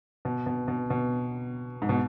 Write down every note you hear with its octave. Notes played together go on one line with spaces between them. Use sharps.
B2
B2
B2
B2
G#2
B2